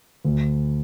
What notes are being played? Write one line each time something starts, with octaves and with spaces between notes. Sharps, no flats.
D2